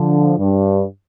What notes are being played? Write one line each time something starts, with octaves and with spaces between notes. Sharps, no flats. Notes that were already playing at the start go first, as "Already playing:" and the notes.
Already playing: D3 F3
G2